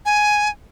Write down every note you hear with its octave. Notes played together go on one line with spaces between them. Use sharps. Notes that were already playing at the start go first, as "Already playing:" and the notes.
G#5